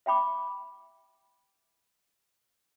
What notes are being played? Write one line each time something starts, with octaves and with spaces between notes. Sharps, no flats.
E5 G5 B5 D6